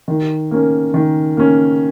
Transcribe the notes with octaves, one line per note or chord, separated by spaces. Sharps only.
D#3
A#3 C#4
D#3
A#3 C#4